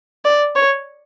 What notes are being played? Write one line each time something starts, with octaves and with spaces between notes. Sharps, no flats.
D5
C#5